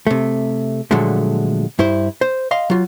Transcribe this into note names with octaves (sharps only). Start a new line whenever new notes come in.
C3 A3
A#2 D3 F3 F#3 G#3 A3
G2 E4 C5
C5
D#5 F5 C6
F#3 F4